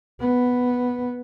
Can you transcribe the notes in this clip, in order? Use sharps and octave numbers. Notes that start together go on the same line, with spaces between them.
B3